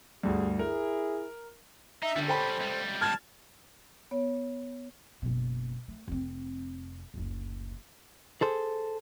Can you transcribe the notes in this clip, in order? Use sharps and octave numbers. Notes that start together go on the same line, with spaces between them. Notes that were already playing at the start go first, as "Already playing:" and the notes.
D2 G2 G4 G#4
E4 G#4 A#4
D#4 E5
D3 G3 C#4
A4 C5 G5 B5
C#2 G3
A5 F6 G#6 A6
B3 C#5
F#1 B2
A3
F1 C4
F#1 D2
G#4 A4 C5